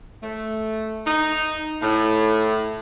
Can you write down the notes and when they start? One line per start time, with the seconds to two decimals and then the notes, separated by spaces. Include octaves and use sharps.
0.23 A3
1.06 D#4
1.82 A2